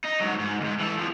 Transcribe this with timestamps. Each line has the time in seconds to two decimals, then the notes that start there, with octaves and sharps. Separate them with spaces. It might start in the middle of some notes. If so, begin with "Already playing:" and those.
0.05 D#4
0.20 G#2 F#3
0.39 G#2
0.61 D#2 G#2
0.80 E3 A4
0.98 E2 F3